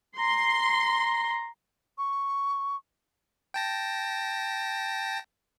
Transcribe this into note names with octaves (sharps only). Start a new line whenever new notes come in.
A#5 C6
C#6
G5 A5 A#6